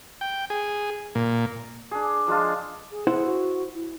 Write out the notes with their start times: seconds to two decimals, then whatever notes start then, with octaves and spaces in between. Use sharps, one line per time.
0.21 G5
0.50 G#4
1.15 A#2
1.91 D4 G#4
2.27 F3 G#3 D4 F4
2.92 G#4
3.07 E4 G#4 C5 F#5
3.24 F#4
3.74 E4